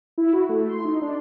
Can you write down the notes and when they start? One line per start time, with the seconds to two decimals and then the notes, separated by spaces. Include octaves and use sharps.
0.18 E4
0.33 F#4
0.49 A3
0.69 C6
0.85 D#4
1.02 D4